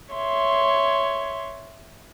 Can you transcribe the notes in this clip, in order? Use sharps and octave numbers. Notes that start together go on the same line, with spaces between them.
C#5 E5 C6